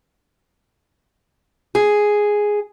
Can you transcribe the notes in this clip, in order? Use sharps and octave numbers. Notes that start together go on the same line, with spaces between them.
G#4